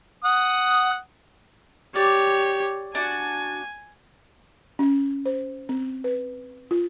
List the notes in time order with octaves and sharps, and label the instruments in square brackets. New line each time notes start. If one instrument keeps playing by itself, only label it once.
[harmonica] F#5 D#6
[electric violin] G4 C#5 [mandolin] D5
[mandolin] D4 F#4 [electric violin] G#5
[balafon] C#4
C5
C4
B4
F4